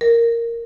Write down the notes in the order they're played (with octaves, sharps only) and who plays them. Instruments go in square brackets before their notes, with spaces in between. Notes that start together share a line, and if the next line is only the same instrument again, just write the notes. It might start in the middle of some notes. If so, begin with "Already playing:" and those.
[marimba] A#4